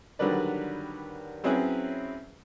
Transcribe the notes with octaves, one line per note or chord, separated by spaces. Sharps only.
D3 D#3 F#3 G3 B4 D5
F#3 C4 C#4 E4 G#4 B4